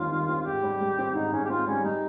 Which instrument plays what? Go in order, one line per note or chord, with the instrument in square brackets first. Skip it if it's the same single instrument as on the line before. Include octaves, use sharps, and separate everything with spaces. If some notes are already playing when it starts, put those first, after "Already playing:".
Already playing: [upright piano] D#2 D#3 G3 C4 [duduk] F4
[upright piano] D#3
C4
[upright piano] G#2 [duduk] G4
[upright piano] G3
G3
C4
[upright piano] G#2 [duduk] D#4
[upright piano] G#2 [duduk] C#4
[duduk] G4
[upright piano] C4 [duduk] F4
[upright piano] G3 [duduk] C#4
[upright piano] G3 [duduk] D#4